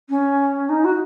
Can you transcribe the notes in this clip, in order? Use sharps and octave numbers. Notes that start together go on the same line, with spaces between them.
C#4
D#4
F#4